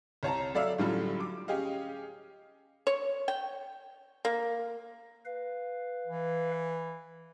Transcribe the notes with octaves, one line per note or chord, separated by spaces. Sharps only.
C2 C#5 A5 A#5
F#3 A4 D5 E5 F5 E6
A2 D3 F#3 G3 C#4 F4
D6
C#4 G4 G#4 D#5 F5
C#5
G5
A#3
B4 F5
E3